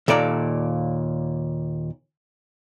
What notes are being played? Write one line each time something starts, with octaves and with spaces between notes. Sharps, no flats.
D#2 A#2 A4 D5 A#5